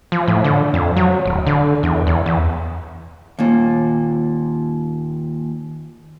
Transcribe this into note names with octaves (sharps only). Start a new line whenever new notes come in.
F3
A2
D3
F2
F#3
D1
D3
E2
E2
E2
D#2 A#2